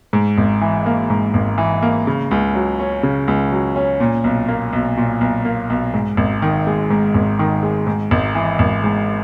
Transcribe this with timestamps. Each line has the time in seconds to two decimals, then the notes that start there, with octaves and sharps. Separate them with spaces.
0.13 G#2
0.38 G#1
0.61 E3
0.86 A#3
1.10 G#2
1.34 G#1
1.58 E3
1.82 A#3
2.07 C#3
2.31 C#2
2.55 F#3
2.79 C#4
3.03 C#3
3.28 C#2
3.52 F#3
3.76 C#4
4.00 A#2
4.24 B1
4.48 A#3
4.73 B1
4.97 A#2
5.21 B1
5.45 A#3
5.70 B1
5.94 G#2
6.17 G#1
6.42 D#3
6.67 G#3
6.90 G#2
7.14 G#1
7.39 D#3
7.63 G#3
7.87 G#2
8.11 G#1
8.35 E3
8.59 G#1
8.84 G#2